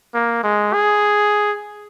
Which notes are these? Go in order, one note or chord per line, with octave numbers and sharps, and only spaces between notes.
A#3
G#3
G#4